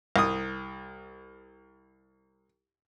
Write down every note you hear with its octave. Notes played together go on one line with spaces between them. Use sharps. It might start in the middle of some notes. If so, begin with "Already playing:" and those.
C2 D#6